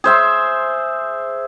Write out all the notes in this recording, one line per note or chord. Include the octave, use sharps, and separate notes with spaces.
G#4 C5 E5 C6